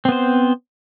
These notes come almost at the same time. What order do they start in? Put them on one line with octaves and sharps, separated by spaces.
C4 B3 C5